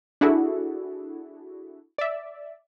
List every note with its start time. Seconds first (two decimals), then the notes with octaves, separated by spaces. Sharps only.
0.21 D4 E4 F#4 G#4 A4
1.98 D5 E5